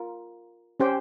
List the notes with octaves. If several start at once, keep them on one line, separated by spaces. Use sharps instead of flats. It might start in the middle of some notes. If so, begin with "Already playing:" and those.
Already playing: F4 A#4
C#4 G4 C5 G5